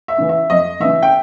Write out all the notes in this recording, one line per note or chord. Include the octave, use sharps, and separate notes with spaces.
E5
C#3 E3
E5
F2 D#5
C#3 E3 E5
G5